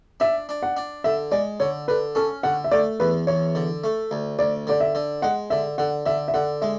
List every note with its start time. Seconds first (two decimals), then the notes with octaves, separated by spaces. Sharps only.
0.20 D4 E5
0.49 D4
0.63 F#5
0.77 D4
1.04 D3 E5
1.32 G#3 D5
1.60 D3 C#5
1.88 D3 B4
2.15 C#4 A4
2.43 D3 F#5
2.64 E5
2.72 A3 D5
3.00 E2 B4
3.27 E2 C#5
3.55 D3
3.84 A3
4.11 D2
4.39 D2 D5
4.67 D3 D5
4.80 E5
4.95 D3
5.22 G#3 F#5
5.50 D3 E5
5.78 D3 F#5
6.06 D3 E5
6.28 E5
6.34 D3 F#5
6.62 G#3 E5